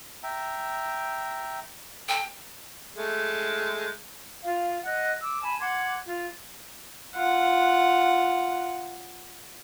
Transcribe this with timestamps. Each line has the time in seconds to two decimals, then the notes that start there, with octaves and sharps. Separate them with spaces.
0.23 E5 G5 A#5
2.09 A4 G5
2.96 G#3 A3
4.43 F4 F5
4.84 D#5 F#5 F#6
5.22 D6 E6
5.42 G#5 A5 B5
5.60 F#5 C6 D6 G#6
6.05 F4
7.15 F4 F#5